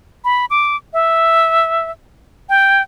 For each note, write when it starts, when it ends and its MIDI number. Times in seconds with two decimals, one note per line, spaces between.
0.25 0.45 83
0.50 0.76 86
0.93 1.91 76
2.49 2.82 79